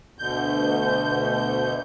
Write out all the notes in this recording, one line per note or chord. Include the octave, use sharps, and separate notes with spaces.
D2 B2 D3 G6